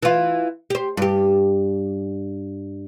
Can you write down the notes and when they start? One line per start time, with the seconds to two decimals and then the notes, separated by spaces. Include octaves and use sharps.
0.03 E3 F4
0.70 G4 C5
0.97 G2 G4